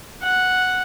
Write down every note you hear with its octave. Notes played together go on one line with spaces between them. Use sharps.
F#5